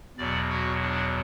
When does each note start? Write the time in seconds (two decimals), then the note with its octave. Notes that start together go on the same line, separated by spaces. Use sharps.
0.18 E2 B2 F#3 D5
0.50 F#4
0.82 D4